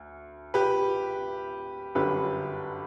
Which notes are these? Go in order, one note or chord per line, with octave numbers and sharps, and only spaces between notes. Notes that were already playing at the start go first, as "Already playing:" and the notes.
Already playing: D2
G4 B4
G1 F#2 D3 G4 B4